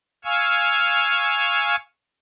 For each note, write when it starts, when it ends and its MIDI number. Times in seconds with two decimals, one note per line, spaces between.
0.25 1.76 77
0.25 1.76 80
0.25 1.76 85
0.25 1.76 88
0.25 1.76 89